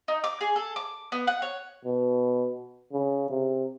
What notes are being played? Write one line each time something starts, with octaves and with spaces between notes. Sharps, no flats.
D#4
D6
G#4
A4
D6
B3
F#5
C#5
B2
C#3
C3